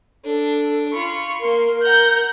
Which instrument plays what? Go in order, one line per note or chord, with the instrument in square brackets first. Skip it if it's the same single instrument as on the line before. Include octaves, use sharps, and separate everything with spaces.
[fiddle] D4 [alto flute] A4
[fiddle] F4 B5 [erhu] C#6
[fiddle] A#3 C6 [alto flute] A#4
[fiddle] F#5 A#5 [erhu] G6